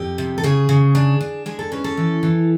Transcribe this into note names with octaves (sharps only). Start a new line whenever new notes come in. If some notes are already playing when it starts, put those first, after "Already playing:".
Already playing: F2 G4
C3
A4
C#3 G#4
C#3
D4
D4
G#3 G#4
A4
C#4 B4
A4
E3
E3